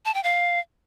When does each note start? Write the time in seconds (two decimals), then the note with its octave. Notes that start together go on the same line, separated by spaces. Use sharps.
0.05 A5
0.14 G5
0.24 F5